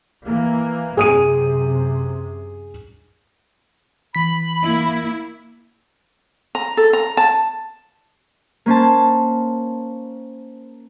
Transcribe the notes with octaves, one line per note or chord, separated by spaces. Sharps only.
E3 A#3
F#2 C3 G#4 D#6 D#7
E3 B5 B6
A#3 E4
A#5
A4
A#5
A5
A#3 C#4 C5 A5